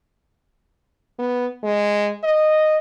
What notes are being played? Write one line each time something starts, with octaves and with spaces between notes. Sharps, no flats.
B3
G#3
D#5